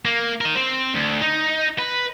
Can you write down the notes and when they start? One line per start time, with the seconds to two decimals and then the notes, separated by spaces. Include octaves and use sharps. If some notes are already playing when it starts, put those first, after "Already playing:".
0.05 A#3
0.41 A#4 D#5
0.55 C4
0.94 D2
1.22 D#4
1.79 B4